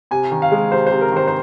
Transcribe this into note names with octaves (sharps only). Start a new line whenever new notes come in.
C3 G#5
D#3
F5
G#3
C3 C5
C3 C5
A#4
D#3 C5
C5